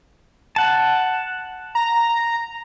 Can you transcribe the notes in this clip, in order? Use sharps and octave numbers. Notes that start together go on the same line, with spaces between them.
F#5 A5
A#5